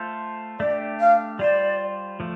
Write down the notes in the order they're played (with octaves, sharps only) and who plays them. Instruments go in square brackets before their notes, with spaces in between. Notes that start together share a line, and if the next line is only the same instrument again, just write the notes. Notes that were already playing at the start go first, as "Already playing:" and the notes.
Already playing: [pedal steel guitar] A3 F4 A4 C5
[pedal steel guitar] A3 D4 G4 [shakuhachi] D5
[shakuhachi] F5
[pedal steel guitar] G3 F4 C5 [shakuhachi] D5
[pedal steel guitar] F3 A3